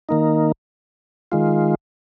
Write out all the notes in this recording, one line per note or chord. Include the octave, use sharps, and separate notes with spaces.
D#3 A#3 D#4
D#3 G#3 F4